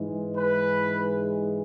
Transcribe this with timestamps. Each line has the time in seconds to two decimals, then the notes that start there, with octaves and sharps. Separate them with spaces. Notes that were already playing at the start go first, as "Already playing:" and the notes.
Already playing: G#2 E3 G#3
0.36 B4